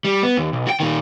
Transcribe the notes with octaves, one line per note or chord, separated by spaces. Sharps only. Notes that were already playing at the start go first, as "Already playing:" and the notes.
G3
B3
D#2
B1
F#4 G5
A#2 D#3